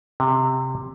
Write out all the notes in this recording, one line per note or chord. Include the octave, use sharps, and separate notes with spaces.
C3